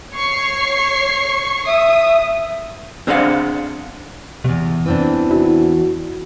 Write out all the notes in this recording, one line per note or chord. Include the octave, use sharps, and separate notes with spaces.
C#5 C#6 C7
E5 D#6
C4 D4 G#4 C5 F5 F#5
E2 G2 C3
E3 C4 D4
E4 F#4